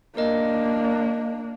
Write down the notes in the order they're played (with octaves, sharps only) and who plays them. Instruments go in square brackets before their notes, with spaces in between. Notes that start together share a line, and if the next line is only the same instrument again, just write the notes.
[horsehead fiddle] A#3 D4 [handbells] A#4 D#5